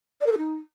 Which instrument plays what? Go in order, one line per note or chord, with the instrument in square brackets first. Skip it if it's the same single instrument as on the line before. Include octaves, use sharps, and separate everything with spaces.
[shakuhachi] D5
A#4
A4
D#4